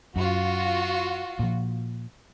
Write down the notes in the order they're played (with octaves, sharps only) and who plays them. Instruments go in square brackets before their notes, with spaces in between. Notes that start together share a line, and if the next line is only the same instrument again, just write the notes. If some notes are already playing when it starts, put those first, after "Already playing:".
[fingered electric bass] F#2 [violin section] F4 F#4
[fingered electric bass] A#2 F3